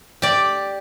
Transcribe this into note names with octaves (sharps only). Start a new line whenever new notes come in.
G4 D5